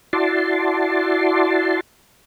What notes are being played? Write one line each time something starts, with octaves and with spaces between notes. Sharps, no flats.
E4 F#4 D5 A5 C6